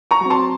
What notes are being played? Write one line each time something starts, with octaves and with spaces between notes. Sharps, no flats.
A#5 C#6
F#3 C4
A5 C6